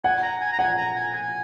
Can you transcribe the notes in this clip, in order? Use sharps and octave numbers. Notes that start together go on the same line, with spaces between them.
F#5 G#5
A#5
G#5
A#5
F#5 G#5
A#5
G#5
G#5